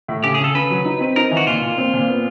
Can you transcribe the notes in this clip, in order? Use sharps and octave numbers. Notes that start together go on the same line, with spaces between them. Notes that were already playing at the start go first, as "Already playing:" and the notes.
A2
C#3 G4
G#4
C#3 A4
C#3 B4
F#3
D#4
C4
D#4 A#4
E3
F#4
A#2 F4
A#2
C4
A#2
B3